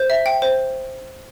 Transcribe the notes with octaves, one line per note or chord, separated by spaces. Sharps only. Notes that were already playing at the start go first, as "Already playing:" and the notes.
Already playing: C5 G6
E5
G5
C5